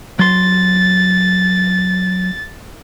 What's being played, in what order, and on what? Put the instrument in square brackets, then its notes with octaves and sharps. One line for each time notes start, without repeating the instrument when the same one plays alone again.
[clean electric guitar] F#3 C6 [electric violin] A6